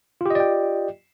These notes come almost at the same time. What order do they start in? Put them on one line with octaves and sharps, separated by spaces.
F4 G4 D#5 D5 G5